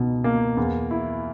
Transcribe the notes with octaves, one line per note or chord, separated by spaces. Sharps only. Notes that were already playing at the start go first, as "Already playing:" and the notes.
Already playing: C#2 B2 D#4
A#3
E2
E4